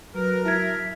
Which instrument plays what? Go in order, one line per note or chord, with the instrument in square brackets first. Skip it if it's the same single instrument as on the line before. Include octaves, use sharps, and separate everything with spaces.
[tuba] F#3 [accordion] A#4 [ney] B4
[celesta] E4 G#6 [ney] E5